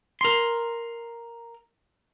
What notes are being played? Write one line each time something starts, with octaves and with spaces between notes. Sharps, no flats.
A#4 C6